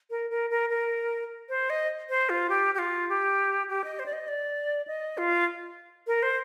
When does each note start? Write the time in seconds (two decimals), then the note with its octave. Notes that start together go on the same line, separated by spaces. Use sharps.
0.10 A#4
0.30 A#4
0.50 A#4
0.70 A#4
1.49 C5
1.70 D#5
2.09 C5
2.29 F4
2.50 G4
2.75 G4
2.79 F4
3.09 G4
3.69 G4
3.84 D#5
3.99 C5
4.06 D5
4.13 D#5
4.28 D5
4.87 D#5
5.18 F4
6.07 A#4
6.23 C5